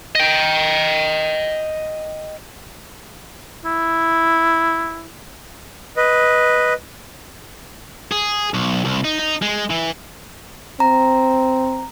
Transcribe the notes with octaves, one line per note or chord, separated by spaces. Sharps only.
D#5 G5
E4
B4 D#5
G#4
B1
C2
D#4
D#4
G#3
E3
C4 A#5